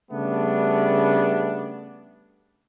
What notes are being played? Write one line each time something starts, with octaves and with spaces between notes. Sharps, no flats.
C#3 G3 A3 B3 D4